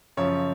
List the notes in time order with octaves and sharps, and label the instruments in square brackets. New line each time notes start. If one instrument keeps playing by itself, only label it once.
[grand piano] F#2 C#3 F3 C#5